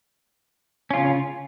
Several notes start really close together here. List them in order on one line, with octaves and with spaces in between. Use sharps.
C#4 F4 C#3